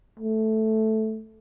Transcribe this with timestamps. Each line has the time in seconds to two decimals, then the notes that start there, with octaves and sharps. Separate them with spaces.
0.20 A3